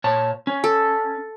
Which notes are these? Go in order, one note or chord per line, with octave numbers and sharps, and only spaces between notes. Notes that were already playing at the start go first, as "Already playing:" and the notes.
A#2 C#5 A5
C#4
A4